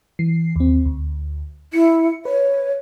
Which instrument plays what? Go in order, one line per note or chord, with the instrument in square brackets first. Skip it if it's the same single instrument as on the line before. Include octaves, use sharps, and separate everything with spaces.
[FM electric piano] E3 C7
D#2 C4
D2
[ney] E4 [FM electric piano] C#7
[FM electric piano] B4 [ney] C#5